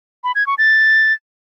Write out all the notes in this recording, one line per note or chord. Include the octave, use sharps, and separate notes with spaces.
B5
G#6
C#6
A6